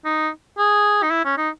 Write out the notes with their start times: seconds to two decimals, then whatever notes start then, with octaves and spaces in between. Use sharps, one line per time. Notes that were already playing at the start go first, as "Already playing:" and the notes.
0.05 D#4
0.58 G#4
1.03 D#4
1.11 E4
1.25 C#4
1.38 D#4